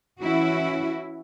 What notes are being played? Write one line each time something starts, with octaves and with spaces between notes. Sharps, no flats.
E3 C#4 E4 F#4